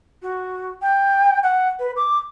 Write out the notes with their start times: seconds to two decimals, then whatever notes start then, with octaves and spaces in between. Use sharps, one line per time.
0.22 F#4
0.82 G5
1.43 F#5
1.79 B4
1.96 D6